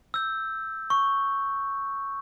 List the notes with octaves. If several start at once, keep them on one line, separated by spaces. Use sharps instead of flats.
E6 G6
C#6